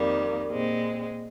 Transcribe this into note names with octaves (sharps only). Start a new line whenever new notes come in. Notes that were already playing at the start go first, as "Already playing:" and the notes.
Already playing: F2 D#3 G3 A#3
A#2 G#3 C4